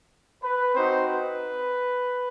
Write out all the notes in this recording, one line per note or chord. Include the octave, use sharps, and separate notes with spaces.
B4
C4 D#4 F#4 C5
B4